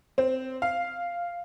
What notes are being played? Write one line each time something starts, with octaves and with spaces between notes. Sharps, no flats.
C4
F5